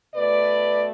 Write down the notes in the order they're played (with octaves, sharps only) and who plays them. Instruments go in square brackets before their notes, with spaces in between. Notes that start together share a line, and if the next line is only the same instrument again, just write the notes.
[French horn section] B2 A3 B4 D5